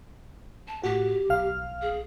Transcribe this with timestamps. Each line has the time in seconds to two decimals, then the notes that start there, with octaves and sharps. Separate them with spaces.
0.68 A5
0.83 A2 F#4 G4
1.29 B1 F5 F6
1.82 G#4